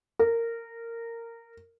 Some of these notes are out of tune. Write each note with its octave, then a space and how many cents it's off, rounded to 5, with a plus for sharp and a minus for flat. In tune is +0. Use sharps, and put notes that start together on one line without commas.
A#4 -15